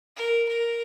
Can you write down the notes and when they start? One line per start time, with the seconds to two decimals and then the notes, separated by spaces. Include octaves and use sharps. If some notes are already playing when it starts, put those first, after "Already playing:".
0.16 A#4
0.48 A#4